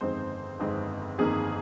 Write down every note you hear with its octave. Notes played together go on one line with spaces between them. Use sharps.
G1 F2 D#3 G#3 C4 C5
G1 F2 D#3 G#3 C4
G1 F2 D#3 A#3 G#4